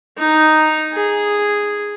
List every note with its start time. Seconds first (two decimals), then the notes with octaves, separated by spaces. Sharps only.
0.18 D#4
0.94 G#4